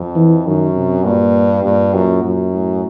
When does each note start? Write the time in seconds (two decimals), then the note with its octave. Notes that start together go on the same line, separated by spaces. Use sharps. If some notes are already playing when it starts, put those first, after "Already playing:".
Already playing: F2
0.15 E3
0.46 F#2 D#3
0.76 C3
1.05 G2 A#2
1.64 G2 A#2
1.94 F#2 A#2
2.24 F#2
2.53 A2